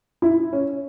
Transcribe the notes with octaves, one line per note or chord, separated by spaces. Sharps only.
E4
C#4